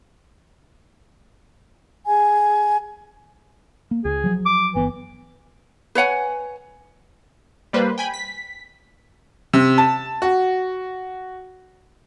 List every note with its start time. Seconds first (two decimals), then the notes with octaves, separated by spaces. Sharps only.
2.07 G#4 G#5
3.91 A#3
4.05 C#2 G#4
4.24 F3 F#3
4.46 D6
4.75 G1 E3 B3
5.95 B4 C#5 F#5 G#5
7.73 G3 A#3 B4 C5
7.98 G5 G#5 B5
8.14 B6
9.53 C3
9.78 A5
10.22 F#4